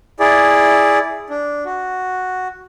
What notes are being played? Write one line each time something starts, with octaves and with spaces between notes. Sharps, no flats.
E4 G#4 D5
D4
F#4